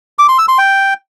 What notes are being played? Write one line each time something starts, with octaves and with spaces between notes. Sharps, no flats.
D6
C6
E6
C6
G5